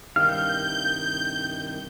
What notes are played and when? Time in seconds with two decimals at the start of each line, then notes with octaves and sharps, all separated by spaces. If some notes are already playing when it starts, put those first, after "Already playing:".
0.16 C2 G2 D#3 F5 G6